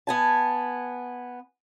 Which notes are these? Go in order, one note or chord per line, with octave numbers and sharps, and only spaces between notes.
B3 G#5 A5